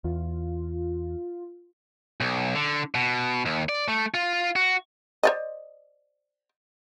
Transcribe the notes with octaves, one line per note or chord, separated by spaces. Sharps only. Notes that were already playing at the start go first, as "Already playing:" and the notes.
E2 F4
B1
D3
B2
D#2
D5
A3
F4
F#4
C5 D5 D#5